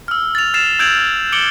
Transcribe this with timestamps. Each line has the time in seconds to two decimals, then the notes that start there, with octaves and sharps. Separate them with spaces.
0.08 E6 F6
0.35 A6 F7
0.54 F6 A6 C7 E7 F7
0.79 E6 G6 G#6 D7 F7 F#7
1.32 D6 C#7 D7 F#7 G7